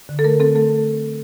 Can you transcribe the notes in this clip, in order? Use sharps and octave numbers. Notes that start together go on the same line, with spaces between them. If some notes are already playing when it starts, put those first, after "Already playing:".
D3
A4
A3 A#4
C4 A4
A3 A4